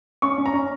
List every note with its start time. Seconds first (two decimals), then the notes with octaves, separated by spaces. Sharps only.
0.22 C#4 C#6
0.38 C#4
0.46 A#5
0.53 C#4